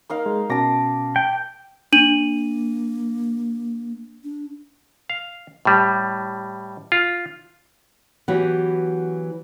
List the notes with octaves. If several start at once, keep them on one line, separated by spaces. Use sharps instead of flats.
A#3 D#4 F5
G#3
B2 C#4 A5 D6 A#6
G5
A#3 D4 D#7 F#7
D4
F5
A2 G3
F4
E3 F#3 B3 F#4 G4